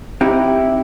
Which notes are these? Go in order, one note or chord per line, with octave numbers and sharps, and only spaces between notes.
C4 D#4 E4 G4